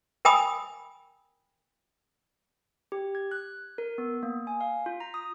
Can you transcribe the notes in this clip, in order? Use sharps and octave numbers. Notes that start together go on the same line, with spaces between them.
A#4 G5 G#5 B5 D#6
G4
G#6
F#6
A#4
B3
A#3
G#5
F5
F4
A#5
D#6